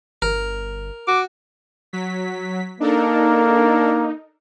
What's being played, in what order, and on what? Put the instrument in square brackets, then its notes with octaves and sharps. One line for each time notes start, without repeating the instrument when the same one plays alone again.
[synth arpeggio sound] G1 [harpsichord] A#4
[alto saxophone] F#4 [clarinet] D6
[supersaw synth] F#3 B6
[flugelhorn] A#3 [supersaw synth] D4 A4 A#4 [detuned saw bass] D#4